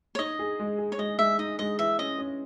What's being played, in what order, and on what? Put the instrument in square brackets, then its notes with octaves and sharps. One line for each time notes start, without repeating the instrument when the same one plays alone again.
[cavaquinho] C#5
[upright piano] D#4 [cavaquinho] D#5
[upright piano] G#4
G#3
G#4
[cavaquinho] C#5
[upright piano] G#3 [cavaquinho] D#5
[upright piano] G#3 [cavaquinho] E5
[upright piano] D#4 [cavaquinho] D#5
[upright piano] G#3 [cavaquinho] D#5
[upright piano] E3 [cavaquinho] E5
[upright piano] C#4 [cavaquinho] D#5
[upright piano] C#4